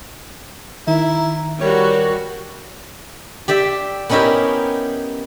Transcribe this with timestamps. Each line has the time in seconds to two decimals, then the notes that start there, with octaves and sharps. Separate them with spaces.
0.87 D#3 E4 A#5
1.61 G3 F#4 A#4 C#5
3.48 G4 D5 E5
4.09 B3 C#4 D#4 E4 G4 A#4